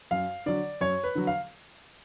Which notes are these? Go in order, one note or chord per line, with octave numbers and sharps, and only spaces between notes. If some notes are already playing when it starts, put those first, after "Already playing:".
F#2 F5
D3 F#3 D5
F#2 C#5
B4
D3 F#3
F5